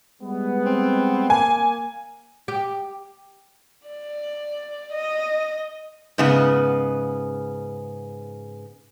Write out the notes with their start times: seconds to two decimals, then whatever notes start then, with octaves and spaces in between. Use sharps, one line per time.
0.22 G3 G#3 B3
0.66 C4
1.30 A#3 G#5
2.48 G4
3.87 D5
4.92 D#5
6.18 G#2 C#3 B3